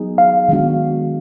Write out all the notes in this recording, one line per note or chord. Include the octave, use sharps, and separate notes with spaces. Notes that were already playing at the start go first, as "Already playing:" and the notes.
Already playing: F#3 B3 D#4 G#4
F5
D#3 G#3 B3 D4 F#4